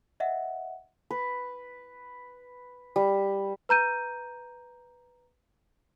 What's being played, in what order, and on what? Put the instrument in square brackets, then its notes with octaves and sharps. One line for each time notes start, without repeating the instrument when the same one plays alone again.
[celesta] D#5 E5 F#5
[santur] B4
G3
[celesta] B4 A#5 G6 D#7